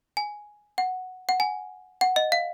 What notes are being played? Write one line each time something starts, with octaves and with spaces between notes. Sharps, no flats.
G#5
F#5
F#5
G#5
F#5
D#5
F5